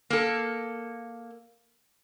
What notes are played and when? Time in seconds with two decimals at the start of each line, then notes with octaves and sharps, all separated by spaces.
0.10 A#3 A4